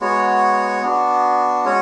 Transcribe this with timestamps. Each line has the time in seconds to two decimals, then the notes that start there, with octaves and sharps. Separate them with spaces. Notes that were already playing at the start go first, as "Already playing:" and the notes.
0.01 G#3 B3 F#4 C#5
0.83 B3 D4 F#4
1.65 G#3 C#4 F#4 C#5